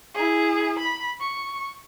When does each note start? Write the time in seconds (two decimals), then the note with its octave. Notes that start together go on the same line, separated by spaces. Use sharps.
0.15 E4 G#4
0.80 B5
1.21 C#6